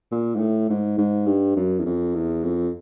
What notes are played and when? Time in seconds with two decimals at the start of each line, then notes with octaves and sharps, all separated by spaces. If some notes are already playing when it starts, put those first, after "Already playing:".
0.11 A#2
0.35 G#2
0.40 A2
0.70 G#2
0.98 G#2
1.26 G2
1.56 F#2
1.79 E2
1.86 F2
2.15 E2
2.44 F2